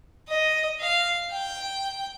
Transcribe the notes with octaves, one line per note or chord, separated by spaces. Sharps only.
D#5
F5
G5